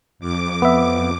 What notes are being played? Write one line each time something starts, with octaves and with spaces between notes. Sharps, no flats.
F2 D6
B3 E5